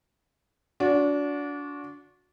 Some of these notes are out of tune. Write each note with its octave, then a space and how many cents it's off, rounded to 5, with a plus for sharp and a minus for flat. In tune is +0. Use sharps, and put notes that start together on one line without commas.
D4 -30 F#4 -30